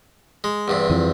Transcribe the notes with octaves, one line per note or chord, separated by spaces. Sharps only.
G#3
E2 G2 C3
F2 E3 F3